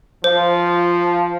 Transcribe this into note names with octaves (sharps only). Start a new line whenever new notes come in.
F3 C5